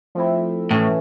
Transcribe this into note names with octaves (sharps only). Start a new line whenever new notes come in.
F3 A3 C4 E4
A2 E3 A3 C#4